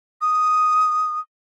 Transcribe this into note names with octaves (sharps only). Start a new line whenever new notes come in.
D#6